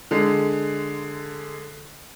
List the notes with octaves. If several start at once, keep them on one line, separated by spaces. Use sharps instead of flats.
D3 G#3